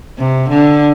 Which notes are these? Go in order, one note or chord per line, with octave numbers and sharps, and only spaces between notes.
C3
D3